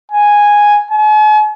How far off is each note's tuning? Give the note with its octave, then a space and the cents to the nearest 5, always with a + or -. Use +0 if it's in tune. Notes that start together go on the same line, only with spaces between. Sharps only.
G#5 -5
G#5 +45